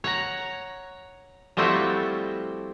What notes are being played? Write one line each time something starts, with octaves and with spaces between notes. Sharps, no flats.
C#5 F#5 A#5
F3 G3 A3 C4 E4 F#4